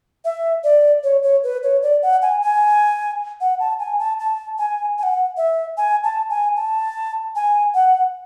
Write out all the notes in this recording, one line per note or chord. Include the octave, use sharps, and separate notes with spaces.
E5
D5
C#5
C#5
B4
C#5
D5
F#5
G#5
G#5
F#5
A5
G#5
A5
A5
G#5
G#5
F#5
E5
G#5
A5
G#5
A5
G#5
F#5